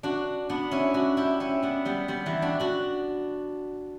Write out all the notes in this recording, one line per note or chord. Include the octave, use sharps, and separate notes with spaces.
D4 F#4
B3 D4
C#4 E4
D4 F#4
E4 G4
C#4 E4
B3 D4
G3 B3
G3 B3
E3 G3
D4 F#4
D4 F#4